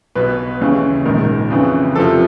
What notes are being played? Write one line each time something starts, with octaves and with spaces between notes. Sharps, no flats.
B1 B2 B4
D#2 C#3 E3
A#1 G#2 D#3 A#4
F2 C#3 E3
F2 C3 F3 A4